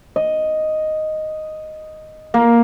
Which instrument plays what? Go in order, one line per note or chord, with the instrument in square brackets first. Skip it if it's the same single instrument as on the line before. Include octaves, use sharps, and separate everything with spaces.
[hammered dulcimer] D#5
A#3